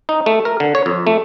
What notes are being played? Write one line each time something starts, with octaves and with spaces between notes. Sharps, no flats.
D#4
A3
A#4
D3
C#5
F2
A3